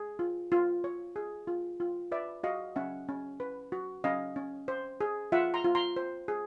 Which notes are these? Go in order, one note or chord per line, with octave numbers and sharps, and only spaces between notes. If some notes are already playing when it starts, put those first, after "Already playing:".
Already playing: G#4
F4
F4
C#5
G#4
F4
F4
B4 D5 E5
F#4 D#5 F5
C#4 E5 F#5
C#4
B4
F#4
C#4 D#5 F5
C#4
C5
G#4
F4 E5 F#5
A#5 C6
F4
A#5 C6
C5
G#4